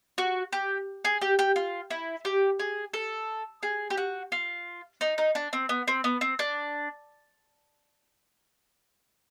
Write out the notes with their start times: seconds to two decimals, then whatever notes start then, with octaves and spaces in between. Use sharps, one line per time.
0.18 F#4
0.53 G4
1.05 G#4
1.22 G4
1.39 G4
1.56 F4
1.91 E4
2.25 G4
2.59 G#4
2.94 A4
3.63 G#4
3.90 G4
3.97 F#4
4.32 F4
5.01 D#4
5.18 D#4
5.35 D4
5.53 C4
5.69 B3
5.88 C4
6.04 B3
6.21 C4
6.39 D4